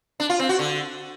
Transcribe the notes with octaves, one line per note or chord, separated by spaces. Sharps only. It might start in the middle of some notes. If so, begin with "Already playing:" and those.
D4
F4
C4
F#4
D3